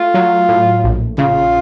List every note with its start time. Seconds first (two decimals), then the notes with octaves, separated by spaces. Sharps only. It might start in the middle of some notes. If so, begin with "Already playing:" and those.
Already playing: A3 F4
0.14 F#3
0.49 A2
0.84 A#1
1.18 C#3 F4